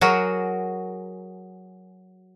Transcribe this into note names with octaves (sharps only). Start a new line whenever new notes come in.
F#3 F#4 G#4 A#4